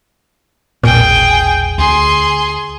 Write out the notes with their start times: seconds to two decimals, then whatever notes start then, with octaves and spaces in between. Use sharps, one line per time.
0.84 E1 A#1 A#2 G#4 G5
1.78 D2 G#4 C6